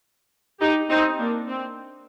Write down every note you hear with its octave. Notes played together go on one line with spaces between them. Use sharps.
D#4 G4
C4 D#4
A#3 D4
C4